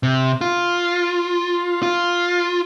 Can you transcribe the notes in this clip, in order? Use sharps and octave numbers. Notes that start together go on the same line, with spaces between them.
C3
F4
F4